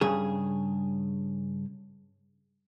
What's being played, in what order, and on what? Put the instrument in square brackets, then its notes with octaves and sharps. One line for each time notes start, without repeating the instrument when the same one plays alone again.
[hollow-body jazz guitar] G2 C#3 G#4